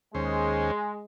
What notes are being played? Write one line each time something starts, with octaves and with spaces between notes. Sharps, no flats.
D#2 G#3 C#4 C5